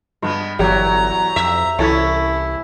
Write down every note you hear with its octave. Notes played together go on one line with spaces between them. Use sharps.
G2 G#3 B3
G1 E2 F#3 G4 A#5
F2 E5
C2 E3 C#4 E4 A4